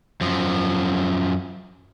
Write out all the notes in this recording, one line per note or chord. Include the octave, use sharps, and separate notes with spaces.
F#2 F3